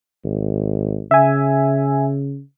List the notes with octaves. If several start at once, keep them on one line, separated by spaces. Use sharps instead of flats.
G#1
C#3 E5 G#5